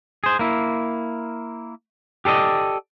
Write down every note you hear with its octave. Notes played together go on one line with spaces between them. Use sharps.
G#4 C5
A#3 E4
G4 A4 D5 D#5